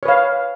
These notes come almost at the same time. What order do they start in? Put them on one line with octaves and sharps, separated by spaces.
C#5 B4 F5